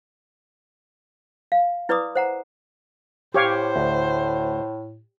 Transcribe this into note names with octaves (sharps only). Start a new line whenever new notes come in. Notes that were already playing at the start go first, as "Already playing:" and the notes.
F5
E4 B4 D5 B5 D6 D#6
C5 F#5 A#5
A2 G4 C5 C#5 F5
D2